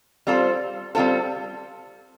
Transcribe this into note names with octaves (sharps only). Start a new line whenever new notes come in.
G3 C4 F4 A4 C5
G3 C4 F4 A4 C5